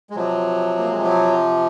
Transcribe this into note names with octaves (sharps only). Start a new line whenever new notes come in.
G#3
C3 F3 F#3
A#3
G#3
F#3